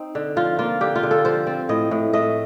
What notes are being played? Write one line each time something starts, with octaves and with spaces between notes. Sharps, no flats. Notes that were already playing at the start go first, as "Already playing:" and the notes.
Already playing: C4 D#4
D3
F3 F4
A#3 F4
D3 G4
F4
D3
A4
F3 C5
C4
A2 D#5
A2
A3 D#5